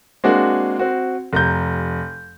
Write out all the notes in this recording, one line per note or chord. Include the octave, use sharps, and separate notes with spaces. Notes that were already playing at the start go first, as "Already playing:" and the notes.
G#3 A#3 C4 D4 F#4
C4 F#4
F1 A#5 G6